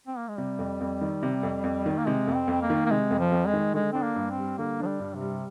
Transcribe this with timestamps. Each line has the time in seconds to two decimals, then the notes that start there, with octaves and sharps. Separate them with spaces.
0.07 C4
0.18 A#3
0.28 G#3
0.37 C3 G3
0.59 F2
0.81 F2
1.01 D#3
1.23 C3
1.43 F2
1.64 F2
1.86 D#3
1.97 A#3
2.06 C3 G#3
2.27 F2
2.34 C4
2.48 F2
2.62 A#3
2.70 D#3
2.86 A#3
2.90 C3 G#3
3.11 F2
3.18 F3
3.32 F2
3.46 G#3
3.53 D#3
3.74 D3 G#3
3.92 C4 D4
4.03 A#3
4.16 G2
4.30 C4
4.38 G3
4.58 D3 A#3
4.80 F3 D4
4.87 G3
5.00 G2
5.15 C3
5.21 G3